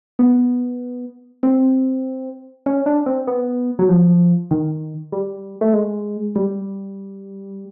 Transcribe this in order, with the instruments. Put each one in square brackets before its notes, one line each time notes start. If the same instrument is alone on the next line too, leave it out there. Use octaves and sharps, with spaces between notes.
[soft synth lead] B3
C4
C#4
D4
C4
B3
F#3
F3
D#3
G3
A3
G#3
G3